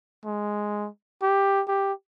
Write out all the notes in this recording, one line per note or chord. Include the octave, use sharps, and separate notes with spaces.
G#3
G4
G4